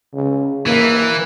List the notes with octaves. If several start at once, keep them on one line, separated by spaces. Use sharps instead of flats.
C#3
E3 A#3